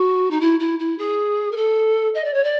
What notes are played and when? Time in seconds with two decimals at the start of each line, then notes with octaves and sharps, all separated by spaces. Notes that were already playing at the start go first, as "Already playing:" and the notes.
Already playing: F#4
0.30 D#4
0.40 E4
0.59 E4
0.79 E4
0.98 G#4
1.51 A#4
1.56 A4
2.14 D#5
2.24 D5
2.33 C#5
2.43 D5